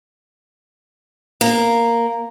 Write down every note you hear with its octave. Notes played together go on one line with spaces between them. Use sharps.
A#3